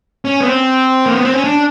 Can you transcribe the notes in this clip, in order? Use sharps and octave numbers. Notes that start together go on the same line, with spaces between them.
C#4
B3
C4
A#3
B3
C4
C#4
D4